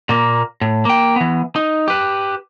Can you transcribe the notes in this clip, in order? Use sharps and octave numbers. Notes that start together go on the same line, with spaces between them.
A#2 A#3
A2
A#3 G5
E3 B3
D#4
G4 B4